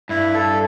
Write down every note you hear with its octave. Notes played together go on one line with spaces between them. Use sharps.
G2 E4
A4